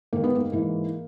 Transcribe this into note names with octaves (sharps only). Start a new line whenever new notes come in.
G#2 D#3 A#3
B3
A#3
G#2 E3